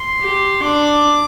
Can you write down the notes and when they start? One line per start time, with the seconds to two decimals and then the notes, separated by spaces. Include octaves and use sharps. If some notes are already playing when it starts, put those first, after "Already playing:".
Already playing: C6
0.20 G4
0.62 D4 D6